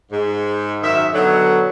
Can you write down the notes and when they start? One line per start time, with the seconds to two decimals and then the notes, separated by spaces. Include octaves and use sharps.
0.11 G#2
0.83 F#2 D#3 E5
1.14 B2 D3 F#3